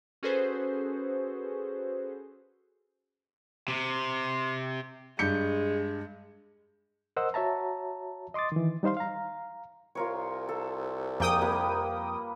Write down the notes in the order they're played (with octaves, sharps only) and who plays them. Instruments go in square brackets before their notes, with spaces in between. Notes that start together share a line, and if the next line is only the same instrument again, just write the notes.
[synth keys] C#4 F#4 G#4 A4 B4 C5
[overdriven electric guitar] C3
[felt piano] G2 G6 C#7 [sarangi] G#3
[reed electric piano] A#4 C5 D#5 F#5 E6
F#4 C#5 E5 A5 A#5
D#5 C6 D6 D#6 A6
D#3 E3
G3 D#4 C5 F5 C6
F5 A#5
[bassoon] C2 [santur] F4 A#4 C#5
[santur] A4
[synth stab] F2 G5 D#6 [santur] A#3 G#4 G#5
[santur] G3 A#3 B4